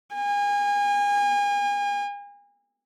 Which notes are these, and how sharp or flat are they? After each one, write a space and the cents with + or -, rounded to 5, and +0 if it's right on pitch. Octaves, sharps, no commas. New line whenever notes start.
G#5 -35